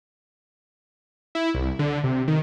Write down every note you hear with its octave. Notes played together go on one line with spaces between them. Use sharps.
E4
C2
D3
C3
D#3